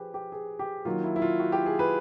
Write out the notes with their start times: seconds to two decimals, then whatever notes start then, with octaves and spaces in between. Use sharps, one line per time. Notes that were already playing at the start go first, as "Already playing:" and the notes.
Already playing: F3 G4 G#4 B4 C5
0.14 G4
0.32 G#4
0.59 G4
0.85 D#3 F#3 A#3 F4
1.04 E4
1.16 E4
1.22 F4
1.40 F#4
1.52 G4
1.66 G#4
1.79 B4